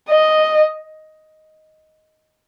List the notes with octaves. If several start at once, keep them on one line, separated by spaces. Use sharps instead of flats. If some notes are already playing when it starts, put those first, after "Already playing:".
D#5